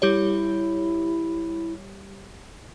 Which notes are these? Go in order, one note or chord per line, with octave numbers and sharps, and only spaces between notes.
G3 E4 G4 C#5